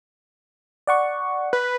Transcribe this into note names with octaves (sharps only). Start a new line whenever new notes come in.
D5 F#5 C#6
B4